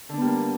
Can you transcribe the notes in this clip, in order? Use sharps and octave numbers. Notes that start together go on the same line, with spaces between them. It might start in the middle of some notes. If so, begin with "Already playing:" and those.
D3 G3 A#3 B3 D4